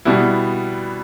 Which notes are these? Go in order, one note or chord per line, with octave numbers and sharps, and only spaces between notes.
B2 G3 B3 E4